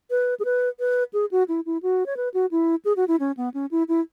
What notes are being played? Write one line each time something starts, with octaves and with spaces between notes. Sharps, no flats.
B4
G#4
B4
B4
G#4
F#4
E4
E4
F#4
C#5
B4
F#4
E4
G#4
F#4
E4
C#4
B3
C#4
E4
E4